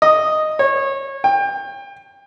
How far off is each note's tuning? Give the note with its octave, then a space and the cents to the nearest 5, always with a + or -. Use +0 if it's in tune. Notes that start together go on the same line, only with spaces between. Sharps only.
D#5 -5
C#5 -25
G5 +30